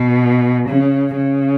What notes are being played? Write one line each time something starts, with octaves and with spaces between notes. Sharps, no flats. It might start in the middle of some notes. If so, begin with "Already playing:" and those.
Already playing: B2
C#3
C#3